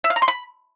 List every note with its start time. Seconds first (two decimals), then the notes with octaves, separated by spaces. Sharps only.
0.04 E5
0.10 F5
0.16 A#5
0.22 C6
0.28 B5